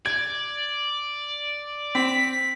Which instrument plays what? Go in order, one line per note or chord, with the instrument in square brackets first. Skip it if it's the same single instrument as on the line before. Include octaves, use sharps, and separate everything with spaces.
[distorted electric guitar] D5 [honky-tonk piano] G#6
[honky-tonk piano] C4 [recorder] B6